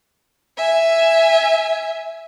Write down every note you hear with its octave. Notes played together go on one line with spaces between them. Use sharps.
E5 G#5